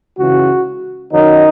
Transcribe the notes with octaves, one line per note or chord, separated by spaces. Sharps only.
C#2 C#3 E3 F#4
F#2 D#3 F#3 D#4